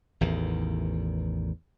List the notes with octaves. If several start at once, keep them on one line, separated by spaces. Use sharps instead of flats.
A1 E2 D#3